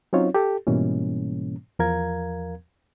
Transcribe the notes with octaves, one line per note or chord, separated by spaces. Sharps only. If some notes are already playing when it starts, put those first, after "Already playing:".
F#3 C4 C#4 D#4 F4 C#5
G4 A4
G#2 B2 E3 G3 A#3 C#4
E2 F3 A#4 F5 A#5 G#6